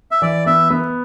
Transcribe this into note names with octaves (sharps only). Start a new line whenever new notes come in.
E5
E3 D5
B3 E5
B3